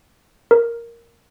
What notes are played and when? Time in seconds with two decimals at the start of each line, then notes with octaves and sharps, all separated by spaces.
0.51 A#4